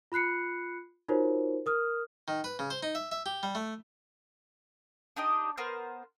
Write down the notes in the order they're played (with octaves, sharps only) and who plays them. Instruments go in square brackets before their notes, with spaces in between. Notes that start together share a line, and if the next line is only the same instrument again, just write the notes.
[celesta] F4 B5 F#6 C7 C#7
D#4 F4 F#4 A#4 C5 C#5
A#4 D#6 F6
[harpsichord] D#3
B4
C#3
C5
D#4
E5
E5
G4
G3
A3
[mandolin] D4 D#4 G4 D#5
B3 A#4 C5 F6